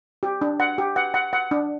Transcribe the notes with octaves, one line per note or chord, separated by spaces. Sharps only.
G4
D4
F#5
G4
F#5
F#5
F#5
D4